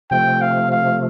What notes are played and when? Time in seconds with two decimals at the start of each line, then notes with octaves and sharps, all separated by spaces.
0.11 C3 F3 A3 G5
0.41 F5
0.72 F5